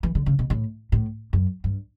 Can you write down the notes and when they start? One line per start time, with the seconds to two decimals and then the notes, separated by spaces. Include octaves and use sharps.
0.03 E3
0.15 D3
0.26 C#3
0.39 B2
0.50 A2
0.92 A2
1.33 F#2
1.64 G2